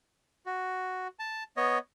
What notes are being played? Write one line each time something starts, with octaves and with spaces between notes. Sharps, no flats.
F#4
A5
B3 C#5 D#5